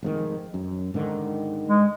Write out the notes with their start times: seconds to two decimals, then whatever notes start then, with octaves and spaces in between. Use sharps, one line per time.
0.03 F1 G#2 D#3
0.54 F#2
0.94 G#2 D3 D#3
1.68 G#3